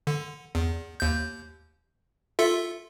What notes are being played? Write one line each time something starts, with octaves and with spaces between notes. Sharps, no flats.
D3
E2
D#2 G6
F4 A4 E5